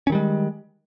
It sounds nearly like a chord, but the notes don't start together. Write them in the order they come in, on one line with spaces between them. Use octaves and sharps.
C#4 D#3 G3 G#3